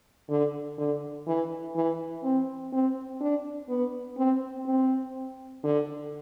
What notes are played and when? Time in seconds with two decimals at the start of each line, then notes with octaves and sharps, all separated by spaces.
0.30 D3
0.78 D3
1.27 E3
1.75 E3
2.24 C4
2.72 C4
3.21 D4
3.69 B3
4.18 C4
4.66 C4
5.64 D3